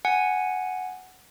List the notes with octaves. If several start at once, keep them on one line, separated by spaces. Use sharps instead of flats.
F#5 G#5